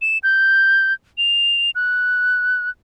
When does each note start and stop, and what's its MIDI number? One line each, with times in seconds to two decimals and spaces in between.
0.02 0.18 100
0.23 0.93 91
1.18 1.71 101
1.75 2.70 90